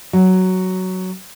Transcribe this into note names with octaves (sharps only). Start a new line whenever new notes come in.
F#3